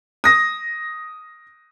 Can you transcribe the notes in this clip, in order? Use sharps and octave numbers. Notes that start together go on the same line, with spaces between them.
D#6 A#6